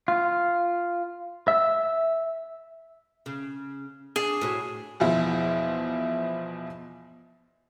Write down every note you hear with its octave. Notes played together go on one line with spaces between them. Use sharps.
F4
E5
C#3
D4 G#4
A2 F#4 C#5
E2 B2 F3 E4